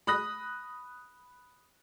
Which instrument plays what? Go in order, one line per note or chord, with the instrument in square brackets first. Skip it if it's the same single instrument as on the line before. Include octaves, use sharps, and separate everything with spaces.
[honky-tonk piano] B5 D#6 F#6 A#6